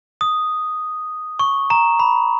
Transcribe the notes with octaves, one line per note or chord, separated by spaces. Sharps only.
D#6
C#6
A#5
B5